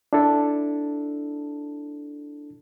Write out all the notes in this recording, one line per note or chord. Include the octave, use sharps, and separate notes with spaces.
D4 E4 A4